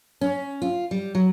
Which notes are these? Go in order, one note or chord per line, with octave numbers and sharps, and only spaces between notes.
C#4
F4
G3
F#3